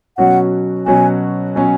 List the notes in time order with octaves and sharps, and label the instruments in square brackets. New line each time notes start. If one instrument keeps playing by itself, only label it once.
[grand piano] B2 F#3 C#4 F#4 [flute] F#5
[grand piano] B2 F#3 C#4 F#4 [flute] G#5
[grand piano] B2 F#3 C#4 F#4 [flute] G#5